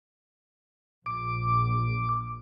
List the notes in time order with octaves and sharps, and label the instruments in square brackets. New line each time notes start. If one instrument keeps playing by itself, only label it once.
[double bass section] A#1 [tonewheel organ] D6